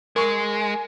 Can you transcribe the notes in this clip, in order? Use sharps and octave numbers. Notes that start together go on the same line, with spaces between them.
G#3 A#4 G#5 C#6